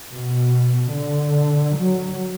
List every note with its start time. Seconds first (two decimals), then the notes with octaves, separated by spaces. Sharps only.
0.13 B2
0.94 D3
1.77 F#3